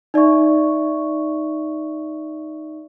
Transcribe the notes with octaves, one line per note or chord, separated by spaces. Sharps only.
D#4 D5 E5 C#6